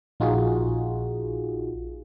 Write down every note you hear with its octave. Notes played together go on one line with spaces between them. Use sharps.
A#1 D#4 F4 F#4 G#4